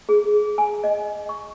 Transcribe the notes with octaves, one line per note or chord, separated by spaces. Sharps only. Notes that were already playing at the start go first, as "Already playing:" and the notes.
G#4
G#5
D#5
C#6